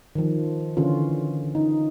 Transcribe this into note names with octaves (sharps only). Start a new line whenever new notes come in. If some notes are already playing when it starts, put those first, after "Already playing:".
D#3 F3
D3 E3 C#4 F4
D#4